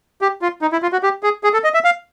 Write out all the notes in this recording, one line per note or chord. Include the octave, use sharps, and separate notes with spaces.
G4
F4
D#4
E4
F4
F#4
G4
G#4
G#4
A4
D#5
E5
F5